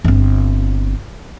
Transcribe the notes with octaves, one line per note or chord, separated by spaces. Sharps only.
G1 C4